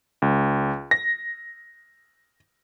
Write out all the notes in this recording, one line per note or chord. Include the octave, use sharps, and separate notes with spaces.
C#2
A#6